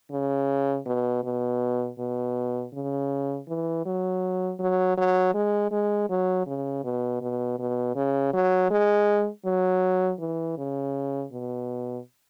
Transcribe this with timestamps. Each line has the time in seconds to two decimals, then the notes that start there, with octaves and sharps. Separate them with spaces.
0.11 C#3
0.86 B2
1.24 B2
1.99 B2
2.73 C#3
3.48 E3
3.86 F#3
4.59 F#3
4.97 F#3
5.34 G#3
5.71 G#3
6.10 F#3
6.47 C#3
6.84 B2
7.21 B2
7.59 B2
7.95 C#3
8.33 F#3
8.71 G#3
9.45 F#3
10.20 E3
10.58 C#3
11.32 B2